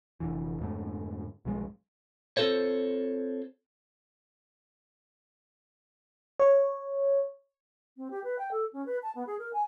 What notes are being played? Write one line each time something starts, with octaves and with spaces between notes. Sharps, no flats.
F1 D#2 D3 E3
F2 G#2 D3 A3
B1 G2 F3 G#3
C4 F4 A4 C5 C#5
C#5
C4
G4
B4
G5
A4
C#4
B4
A5
B3
G#4
A#4
G#5